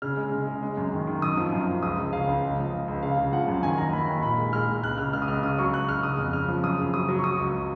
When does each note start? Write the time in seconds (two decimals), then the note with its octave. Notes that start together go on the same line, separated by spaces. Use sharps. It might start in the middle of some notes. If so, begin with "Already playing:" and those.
0.02 C#3 F6
0.17 G#3
0.32 C#3
0.47 G#3
0.63 G#3
0.77 F#2
0.93 D#3
1.07 D#3
1.22 F#2 D#6
1.37 F3
1.53 F#2
1.67 F3
1.82 C#2 D#6
1.98 C#3
2.13 C#3 F5
2.27 C#2
2.43 C#2
2.58 F3
2.73 C#2
2.88 C#2
3.03 C#3 F5
3.18 C#3
3.33 F3 F#5
3.48 F#2
3.63 D#3 G#5
3.78 D#2 A#5
3.93 D#2 B5
4.08 D#3
4.23 A#2 B5
4.38 G#3
4.53 G#3 F6
4.68 G#3
4.83 C#2 F#6
4.98 C#3 F6
5.13 C#2 F6
5.22 D#6
5.28 C#2 F6
5.43 C#3 D#6
5.58 F#3 C#6
5.74 F#3 F#6
5.88 C#2 F6
6.03 C#3 D#6
6.18 F2
6.33 C#3 F6
6.48 F3
6.64 F#2 D#6
6.79 C#3
6.94 F#3 D#6
7.09 F#3
7.19 C#6
7.24 F#3 D#6
7.39 C#2